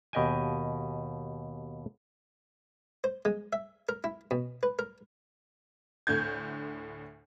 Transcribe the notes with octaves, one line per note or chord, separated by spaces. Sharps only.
D#2 B2 G4 D#5 G5 G#5
C5
G#3
E5
A#4
E4
B2
B4
A#4
D2 A2 D3 G6 G#6